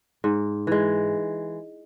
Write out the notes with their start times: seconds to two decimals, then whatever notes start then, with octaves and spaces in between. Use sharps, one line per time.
0.24 G#2
0.67 E3 G#3